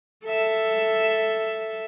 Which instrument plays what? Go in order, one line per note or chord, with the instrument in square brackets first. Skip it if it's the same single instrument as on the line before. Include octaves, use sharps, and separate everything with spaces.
[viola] A4 E5